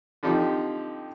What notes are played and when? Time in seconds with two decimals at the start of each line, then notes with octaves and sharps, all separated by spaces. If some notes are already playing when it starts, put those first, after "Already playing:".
0.23 D3 F3 C4 D#4 G4